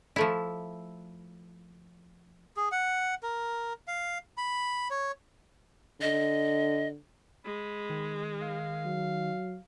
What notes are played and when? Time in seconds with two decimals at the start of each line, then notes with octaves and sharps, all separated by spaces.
0.16 F3 A3 E4
2.57 G#4
2.72 F#5
3.23 A#4
3.88 F5
4.37 B5
4.90 C#5
6.01 D3 D#5
7.45 G#3 B5
7.90 D#3
8.42 F5
8.85 F#3